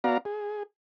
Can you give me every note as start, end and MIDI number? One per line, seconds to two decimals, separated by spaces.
0.04 0.18 59
0.04 0.18 66
0.04 0.18 74
0.04 0.18 77
0.04 0.18 82
0.25 0.63 68